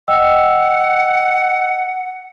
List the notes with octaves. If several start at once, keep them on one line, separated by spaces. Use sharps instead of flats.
D#5 F#5 G5 E6